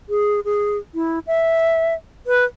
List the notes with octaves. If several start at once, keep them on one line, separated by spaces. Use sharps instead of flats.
G#4
G#4
E4
E5
B4